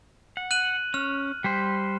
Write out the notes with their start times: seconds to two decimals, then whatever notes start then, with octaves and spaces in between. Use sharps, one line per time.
0.37 F#5
0.51 F#6 D#7 F#7
0.94 C#4 F6
1.44 G3 G4 C5